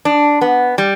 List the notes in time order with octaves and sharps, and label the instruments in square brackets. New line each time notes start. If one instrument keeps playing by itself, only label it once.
[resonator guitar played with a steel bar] D4
B3
G3